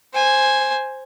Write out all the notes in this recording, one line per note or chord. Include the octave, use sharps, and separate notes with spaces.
C5 G#5